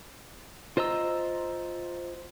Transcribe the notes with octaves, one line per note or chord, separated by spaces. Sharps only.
F4 C5 D#5 A#5 E6